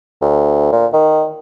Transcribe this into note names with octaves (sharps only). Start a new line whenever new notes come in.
D2
A#2
D#3